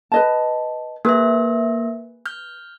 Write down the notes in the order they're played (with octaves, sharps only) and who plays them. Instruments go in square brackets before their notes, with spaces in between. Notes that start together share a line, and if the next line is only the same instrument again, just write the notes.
[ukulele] B4 D#5 A5
[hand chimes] A#3 E5 [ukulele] G#4 B4
[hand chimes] F6 G6